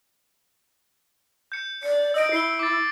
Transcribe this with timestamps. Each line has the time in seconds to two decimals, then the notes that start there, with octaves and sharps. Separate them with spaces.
1.52 G6 C#7
1.83 D5 C#7
2.14 D#5 E6 D7
2.32 E4 C7 G7
2.59 D6 A6